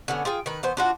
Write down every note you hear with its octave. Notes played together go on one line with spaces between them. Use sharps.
D3 B3 C#4
F4 G#4 G5
D#3 B4
E3 B3 C5
D4 F4 F#4